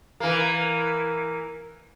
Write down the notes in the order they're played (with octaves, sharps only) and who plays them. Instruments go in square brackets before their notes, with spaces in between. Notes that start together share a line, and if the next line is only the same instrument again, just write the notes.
[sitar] E3 A#3